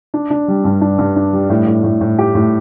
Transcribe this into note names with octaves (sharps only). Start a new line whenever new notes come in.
D4
D4
G3
G2
D4
G2
D4
G3
A2
A2
A2
A2
G4
A2